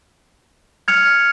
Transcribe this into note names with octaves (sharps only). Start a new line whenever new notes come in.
F6 G#6 C#7 F7